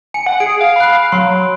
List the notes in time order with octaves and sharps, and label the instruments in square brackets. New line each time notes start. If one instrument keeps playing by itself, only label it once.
[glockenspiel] G#5 [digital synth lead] C#7
[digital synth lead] F#5
[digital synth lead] G#4 [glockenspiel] D7
[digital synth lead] F5
[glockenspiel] B5 F#6
[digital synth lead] F#3 [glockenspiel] C6